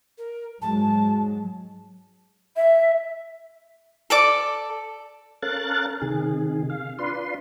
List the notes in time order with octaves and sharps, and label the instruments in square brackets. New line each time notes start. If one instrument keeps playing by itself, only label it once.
[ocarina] A#4
[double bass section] G#2 F#3 G#3 [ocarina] A5
[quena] E5
[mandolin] A4 D5 D6
[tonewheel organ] C#4 A4 A#4 F5 F#6 A6
C3 D#3 G#4
F5
D4 F4 B4 C6